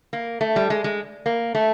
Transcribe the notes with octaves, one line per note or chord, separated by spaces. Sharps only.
A#3
A3
G3
G#3
G#3
A#3
A3